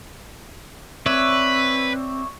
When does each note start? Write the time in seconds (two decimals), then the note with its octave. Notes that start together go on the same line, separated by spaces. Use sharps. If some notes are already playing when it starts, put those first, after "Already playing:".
1.06 C4 B4 C#5 D5 E5